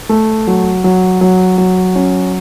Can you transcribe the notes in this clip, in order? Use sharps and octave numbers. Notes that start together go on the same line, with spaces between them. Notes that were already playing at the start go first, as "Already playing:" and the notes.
A3
F#3
F#3
F#3
F#3
C#4